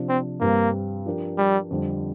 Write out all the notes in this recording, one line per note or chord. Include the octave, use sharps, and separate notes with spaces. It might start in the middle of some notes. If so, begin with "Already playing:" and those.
Already playing: C3 F3 D4
C4
G2 G3 A#3 C4
F3 D4 G4 A#4
G3
F2 D3 G3